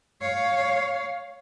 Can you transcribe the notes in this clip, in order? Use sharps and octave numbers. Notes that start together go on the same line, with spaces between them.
C#5 F5